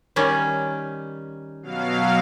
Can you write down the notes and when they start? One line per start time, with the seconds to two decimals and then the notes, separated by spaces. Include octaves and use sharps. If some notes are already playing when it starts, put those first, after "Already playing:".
0.16 D#3 G3 C#4
1.63 B2 F#3 F5